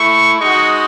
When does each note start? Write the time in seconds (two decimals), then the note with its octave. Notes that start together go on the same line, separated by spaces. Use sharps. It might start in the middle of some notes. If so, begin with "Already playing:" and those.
Already playing: A3 E4 C#6
0.40 G#3 D#4 F#4 C#6